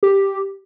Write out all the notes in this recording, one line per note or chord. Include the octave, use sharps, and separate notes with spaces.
G4